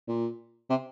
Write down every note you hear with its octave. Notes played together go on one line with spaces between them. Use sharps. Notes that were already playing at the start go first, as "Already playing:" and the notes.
A#2
C3